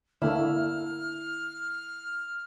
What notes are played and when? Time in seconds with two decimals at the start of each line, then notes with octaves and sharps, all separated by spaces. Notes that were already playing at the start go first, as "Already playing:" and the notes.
0.22 D3 A3 A#3 E4 F6